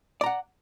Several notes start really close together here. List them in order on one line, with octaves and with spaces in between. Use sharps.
D5 A#5 F#5